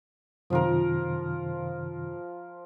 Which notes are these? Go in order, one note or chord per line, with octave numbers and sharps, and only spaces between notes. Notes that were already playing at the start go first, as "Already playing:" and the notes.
F#2 C3 D#3 F3 F4 A#4